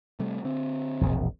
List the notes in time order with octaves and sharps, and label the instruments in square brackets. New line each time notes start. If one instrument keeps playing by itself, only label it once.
[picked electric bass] C3 G3 A3
D3 C4
[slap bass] E1 A#1